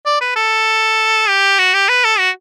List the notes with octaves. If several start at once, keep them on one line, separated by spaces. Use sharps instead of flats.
D5
B4
A4
G4
F#4
G4
B4
A4
F#4